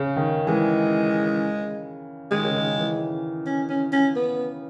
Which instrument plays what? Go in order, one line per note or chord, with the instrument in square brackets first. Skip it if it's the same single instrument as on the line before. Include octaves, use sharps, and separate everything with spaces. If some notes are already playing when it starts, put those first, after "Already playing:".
Already playing: [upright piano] C#3
D#3
[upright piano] E3 [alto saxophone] G#3
[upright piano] D#3 [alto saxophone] G#3
[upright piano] C#3
D#3
E3
[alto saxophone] C#4
C#4
C#4
B3